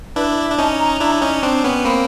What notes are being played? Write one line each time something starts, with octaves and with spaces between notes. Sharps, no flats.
D4 E4 B4
E5
D4
C#4 D#4 A5
A#5
D4 E4
C#4 D#4
C4 D4
B3 C#4
A#3 C4 B5